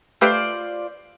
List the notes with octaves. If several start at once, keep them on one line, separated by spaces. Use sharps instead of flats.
A3 F4 G4 B4 C5 D5